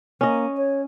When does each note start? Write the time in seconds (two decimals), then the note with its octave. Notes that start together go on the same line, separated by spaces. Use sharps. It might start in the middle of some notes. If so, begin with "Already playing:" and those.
0.21 A#3 C#4 D#5
0.57 C#5